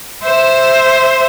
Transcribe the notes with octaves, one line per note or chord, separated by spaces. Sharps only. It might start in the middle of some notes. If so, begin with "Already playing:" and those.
C5 E5